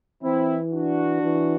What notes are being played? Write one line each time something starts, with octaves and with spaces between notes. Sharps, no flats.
E3 C4 E4
D4 F#4
E3